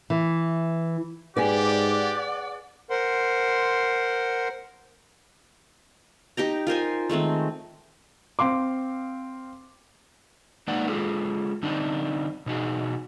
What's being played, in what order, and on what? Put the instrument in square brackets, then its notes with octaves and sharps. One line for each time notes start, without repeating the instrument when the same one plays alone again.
[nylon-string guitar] E3
[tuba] G#2 [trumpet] G4 [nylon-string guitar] G#4 B4 [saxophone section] D5 F#5
[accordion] A#4 C5 F#5 C6
[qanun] D#4 G4 G5 A#5
F4 A#4 C5 G#5
D#3 G#3 A3 C4
[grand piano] C4 F5 C6 D6
[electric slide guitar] G#3 A#3 D#4 B4 D5 F#5
G#3 F4 G#4 A4
D3 G3 C4 D4 D#4
B2 D#4 F#4 G#4